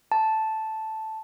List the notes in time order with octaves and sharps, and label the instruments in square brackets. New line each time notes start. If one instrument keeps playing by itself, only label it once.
[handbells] A5